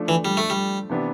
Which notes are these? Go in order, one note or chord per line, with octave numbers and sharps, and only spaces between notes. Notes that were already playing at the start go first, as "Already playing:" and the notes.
Already playing: F3 A3 D4
E3
G3
A3
G3
C3 E3 B3 D4 G4